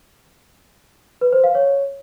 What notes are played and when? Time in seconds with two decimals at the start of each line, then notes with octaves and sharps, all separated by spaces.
1.21 B4
1.33 C5
1.44 F5
1.55 C#5